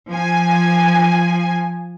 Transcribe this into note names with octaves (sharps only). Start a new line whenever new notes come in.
F3 G#5